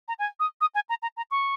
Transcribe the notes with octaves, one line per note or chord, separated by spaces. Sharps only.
A#5
G#5
D#6
D#6
G#5
A#5
A#5
A#5
C#6